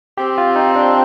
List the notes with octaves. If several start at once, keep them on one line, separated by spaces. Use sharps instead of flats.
C4 G4
F4
D#4
D4